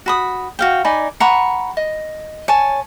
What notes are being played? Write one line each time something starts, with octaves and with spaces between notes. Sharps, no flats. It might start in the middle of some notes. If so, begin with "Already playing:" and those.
F#4 B5 D#6
F#4 F5 G5
D#4 D5 G#5 B5
F#5 A#5 B5 C#6
D#5
C#5 G#5 A5